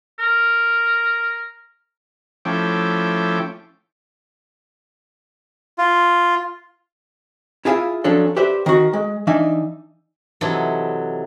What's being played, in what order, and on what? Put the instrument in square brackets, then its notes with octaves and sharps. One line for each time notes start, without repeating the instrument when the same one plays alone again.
[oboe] A#4
[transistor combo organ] F3 A3 C#4 E4 G5 D6
[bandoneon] F4
[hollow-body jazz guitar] E4 F4 G#4 D5 E5 F5
F3 F#3 C#4 D4 A4
G4 B4 C5 D5 E5
D#3 F#4
G#3
E3 D4 D#4 E5 F5
[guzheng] C3 E3 F#3 D#4 A4